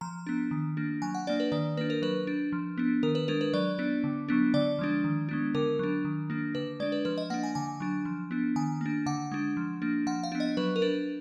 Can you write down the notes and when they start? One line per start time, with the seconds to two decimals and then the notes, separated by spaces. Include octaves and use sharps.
0.01 F3 A#5
0.27 B3 D4
0.51 D#3
0.77 A#3 D4
1.02 F#3 G#5
1.14 F#5
1.27 A#3 D4 D5
1.40 B4
1.52 D#3 D5
1.77 A#3 B4
1.81 D4
1.90 A#4
2.02 F#3 B4
2.27 D4
2.52 F3
2.78 B3 D4
3.03 D#3 A#4
3.15 B4
3.28 G#3 D4 A#4
3.41 B4
3.53 F#3 D5
3.79 B3 D4
4.04 D3
4.29 F#3 B3 D4
4.54 D3 D5
4.79 F3 G#3 D4
5.04 D#3
5.29 G#3 B3 D4
5.55 D3 A#4
5.79 F#3 D4
6.05 D#3
6.30 A#3 D4
6.55 D3 B4
6.80 G#3 D4 D5
6.92 B4
7.05 F3 B4
7.18 D#5
7.30 A#3 F#5
7.34 D4
7.43 G#5
7.55 D3 G#5
7.80 F#3 D4
8.05 F3
8.31 B3 D4
8.56 D#3 G#5
8.81 A#3 D4
9.06 D3 F#5
9.32 G#3 D4
9.57 F3
9.82 A#3 D4
10.07 F3 F#5
10.23 F5
10.32 B3 D4
10.40 D#5
10.57 F#3 B4
10.76 A#4
10.82 D4 B4